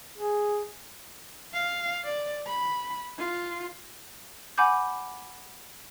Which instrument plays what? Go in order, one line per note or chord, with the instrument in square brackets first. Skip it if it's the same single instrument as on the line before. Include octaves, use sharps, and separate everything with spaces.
[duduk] G#4
[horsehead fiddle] F5
D5
B5
F4
[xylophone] F#5 G#5 B5 D6 G6